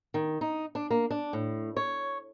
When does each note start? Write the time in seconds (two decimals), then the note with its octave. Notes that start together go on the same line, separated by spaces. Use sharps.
0.14 D#3
0.41 D#4
0.75 D4
0.91 A#3
1.11 D4
1.33 A2
1.77 C#5